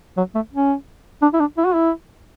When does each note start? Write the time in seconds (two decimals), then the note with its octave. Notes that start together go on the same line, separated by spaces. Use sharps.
0.17 F#3
0.35 A3
0.53 C#4
1.22 D4
1.34 E4
1.40 D4
1.57 E4
1.66 F#4
1.74 E4